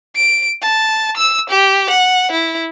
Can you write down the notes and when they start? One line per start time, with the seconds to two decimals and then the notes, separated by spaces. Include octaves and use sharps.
0.16 D7
0.62 A5
1.17 E6
1.49 G4
1.90 F#5
2.32 E4